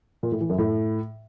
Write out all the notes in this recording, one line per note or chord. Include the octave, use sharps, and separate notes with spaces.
A#2
A2
E3
F#2
A2